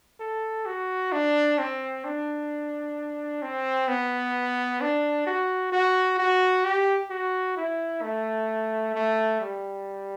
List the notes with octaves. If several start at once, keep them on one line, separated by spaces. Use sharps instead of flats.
A4
F#4
D4
C4
D4
C4
B3
D4
F#4
F#4
F#4
G4
F#4
E4
A3
A3
G3